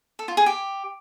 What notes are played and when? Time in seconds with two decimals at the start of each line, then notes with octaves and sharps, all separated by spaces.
0.19 A4
0.28 F4
0.37 G#4
0.46 G4